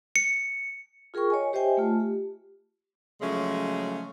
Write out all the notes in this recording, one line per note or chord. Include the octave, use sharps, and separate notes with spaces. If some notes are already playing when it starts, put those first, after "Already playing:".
C#7
F4 G#4 A#4 G5 C#6
C#5 D#5 G#5
G4 C5 D#5 E5 G5 G#5
A3 F4 A5
G4
C#3 F3 F#3 G#3 A3 C#4